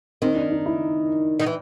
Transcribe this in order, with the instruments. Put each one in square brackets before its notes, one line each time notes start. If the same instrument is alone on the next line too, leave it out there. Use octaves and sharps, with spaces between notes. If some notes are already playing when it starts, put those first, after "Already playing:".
[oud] D#3 [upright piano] C4
[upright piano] D4
D#4
E4
[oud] D#3
E3